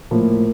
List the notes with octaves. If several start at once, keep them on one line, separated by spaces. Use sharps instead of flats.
A2 F3 A#3